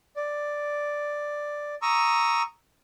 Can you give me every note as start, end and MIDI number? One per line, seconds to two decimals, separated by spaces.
0.16 1.75 74
1.82 2.42 82
1.82 2.42 85
1.82 2.42 87
1.82 2.42 88